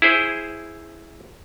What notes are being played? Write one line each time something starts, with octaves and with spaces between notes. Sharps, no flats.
E4 G#4 C5